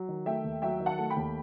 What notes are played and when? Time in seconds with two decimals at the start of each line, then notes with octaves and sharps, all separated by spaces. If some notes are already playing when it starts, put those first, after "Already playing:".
Already playing: F#3
0.09 D#3
0.26 A3 E5 G5
0.44 D#2
0.62 F#3 E5 G5
0.80 D#3
0.86 F#5 A5
0.99 A3
1.10 G5 B5
1.16 D#2